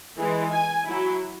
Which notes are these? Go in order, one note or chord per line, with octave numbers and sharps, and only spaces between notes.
E3 G#3 E4
G#5
F#3 E4